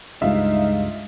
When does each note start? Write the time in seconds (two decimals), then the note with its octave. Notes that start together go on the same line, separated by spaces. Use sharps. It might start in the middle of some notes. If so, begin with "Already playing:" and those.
0.22 C#2 G2 C#3 G#3 D#4 F4 E5 F5